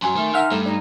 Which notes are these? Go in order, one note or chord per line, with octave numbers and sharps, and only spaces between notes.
F#2 F#3 G#5 C6
D#3 A3
D#4 E5 F#5 F6
G2 A3
D#4 D5